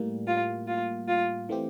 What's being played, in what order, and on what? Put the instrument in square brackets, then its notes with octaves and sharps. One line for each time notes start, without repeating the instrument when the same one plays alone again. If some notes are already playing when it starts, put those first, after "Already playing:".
Already playing: [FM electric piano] A2 G3 A#3
[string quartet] F4
F4
F4
[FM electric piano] E3 A3 C4 G4